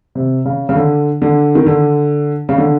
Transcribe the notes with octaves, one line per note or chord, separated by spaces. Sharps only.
C3
C#3
C#3
D3
D3
D#3
D3
C#3
D3